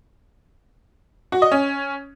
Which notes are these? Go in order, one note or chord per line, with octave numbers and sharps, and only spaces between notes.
F#4
D#5
C#4